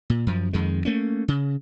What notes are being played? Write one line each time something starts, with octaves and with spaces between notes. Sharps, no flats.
A#2
F#2 F3
F2 D#3 G#3
A3 A#3 C#4
C#3